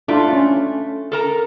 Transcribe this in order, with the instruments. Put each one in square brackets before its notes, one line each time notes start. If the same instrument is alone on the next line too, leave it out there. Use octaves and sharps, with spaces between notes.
[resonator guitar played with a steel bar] A3 [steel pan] D4 E4 F4
[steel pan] C#4
[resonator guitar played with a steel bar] A4 A#4 A#5